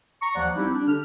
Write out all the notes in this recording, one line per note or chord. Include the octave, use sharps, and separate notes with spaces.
A#5 C#6
D#2 F3 D5 F#5
G3 C4 D#4 E4 G4
D4
D3 G4 F6